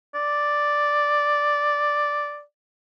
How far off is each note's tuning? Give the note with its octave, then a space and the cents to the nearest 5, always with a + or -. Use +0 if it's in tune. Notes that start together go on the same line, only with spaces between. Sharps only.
D5 +0